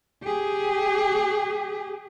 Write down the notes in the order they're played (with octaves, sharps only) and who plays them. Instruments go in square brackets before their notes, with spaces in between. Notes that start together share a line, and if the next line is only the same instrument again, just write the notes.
[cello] G4 G#4